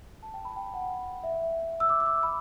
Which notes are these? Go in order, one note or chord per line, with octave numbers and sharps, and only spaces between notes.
A5
G5
B5
G5
F#5
E5
E6
D6
E6
D6
B5